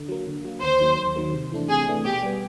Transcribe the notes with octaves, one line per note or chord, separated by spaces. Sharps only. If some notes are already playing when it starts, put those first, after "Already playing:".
Already playing: D3
F#3 A#3
D3
F#3 A#3
D#2 C5
D#3 F#3 A#3
D#2
D#3 F#3 A#3
C3
E3 A3 D4
C3 G#4
E3 A3 D4
B2 G4
G3 B3